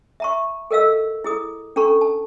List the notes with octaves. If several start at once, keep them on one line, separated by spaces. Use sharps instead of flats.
E5 A#5 C#6
A4 A#4 D#5 F5 E6
E4 G#4 D#6
C#4 D4 A4 A#5 C#6
A5